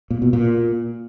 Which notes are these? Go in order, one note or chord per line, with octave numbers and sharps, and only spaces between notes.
A#2
B2
A#2